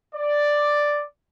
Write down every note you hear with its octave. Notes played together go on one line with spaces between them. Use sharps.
D5